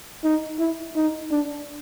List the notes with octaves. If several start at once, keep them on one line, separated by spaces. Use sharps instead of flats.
D#4
E4
D#4
D4